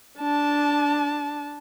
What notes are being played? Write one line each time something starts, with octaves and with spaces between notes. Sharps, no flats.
D4 A5